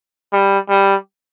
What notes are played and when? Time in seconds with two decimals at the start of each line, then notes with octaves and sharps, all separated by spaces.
0.32 G3
0.69 G3